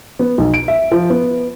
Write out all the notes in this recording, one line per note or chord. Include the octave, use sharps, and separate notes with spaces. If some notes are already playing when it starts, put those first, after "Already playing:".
B3
B1
D7
E5
F3
B3